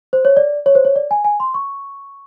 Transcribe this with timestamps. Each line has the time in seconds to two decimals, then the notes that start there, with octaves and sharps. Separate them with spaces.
0.13 C5
0.25 C#5
0.37 D5
0.66 C#5
0.75 C5
0.85 C#5
0.96 D5
1.11 G#5
1.25 G#5
1.40 C6
1.54 C#6